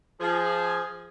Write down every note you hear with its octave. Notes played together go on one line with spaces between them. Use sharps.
F3 G#4